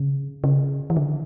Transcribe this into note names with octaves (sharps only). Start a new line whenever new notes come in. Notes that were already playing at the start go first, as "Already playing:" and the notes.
Already playing: C#3
C#3
E3
D3